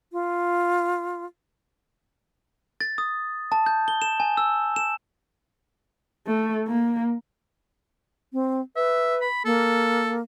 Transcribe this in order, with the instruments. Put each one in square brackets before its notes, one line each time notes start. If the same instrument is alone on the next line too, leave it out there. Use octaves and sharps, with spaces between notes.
[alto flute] F4
[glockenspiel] A6
D#6
A5
G6
G7
E7
G#5
E6
E7
[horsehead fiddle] A3
A#3
[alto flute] C4
[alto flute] B4 [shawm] E5
[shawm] B5
[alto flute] A#3 [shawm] A4